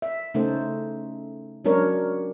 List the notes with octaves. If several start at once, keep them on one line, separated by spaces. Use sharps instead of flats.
E5
C#3 A3 C#4 D#4 A4 C5
F#3 G#3 C#4 D4 A#4 C#5